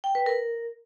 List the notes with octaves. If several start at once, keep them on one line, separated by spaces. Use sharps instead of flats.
G5
B4
A#4